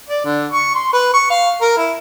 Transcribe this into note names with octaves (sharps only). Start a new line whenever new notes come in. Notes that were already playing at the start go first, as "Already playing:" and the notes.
D5
D3
C#6
C6
B4
C#6
F5
A#4
E4